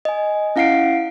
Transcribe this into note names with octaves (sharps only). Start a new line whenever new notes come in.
D#5 G#5
C#4 E4 F5 F#5 C7 D7